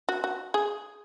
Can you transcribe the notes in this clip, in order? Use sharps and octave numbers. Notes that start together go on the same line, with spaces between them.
F#4
F#4
G#4